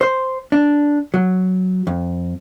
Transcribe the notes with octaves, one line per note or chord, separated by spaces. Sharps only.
C5
D4
F#3
F2